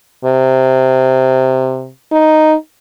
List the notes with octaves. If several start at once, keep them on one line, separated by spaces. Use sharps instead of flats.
C3
D#4